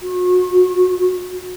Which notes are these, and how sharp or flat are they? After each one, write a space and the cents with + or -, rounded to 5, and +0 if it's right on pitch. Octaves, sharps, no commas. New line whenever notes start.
F#4 -35